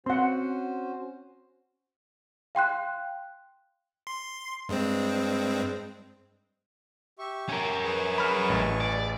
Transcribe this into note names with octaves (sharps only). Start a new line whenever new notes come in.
C4 C#4 F#4 C5 F#5 C6
F5 G5 C6 F#6
C6
G2 G#3 C4
G4 E5 C#6
C#4 A#4
G#4 B4 C#6
B5 F6
A1
D5